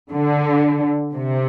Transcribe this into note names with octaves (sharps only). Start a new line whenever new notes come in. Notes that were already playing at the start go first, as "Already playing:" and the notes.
D3
C3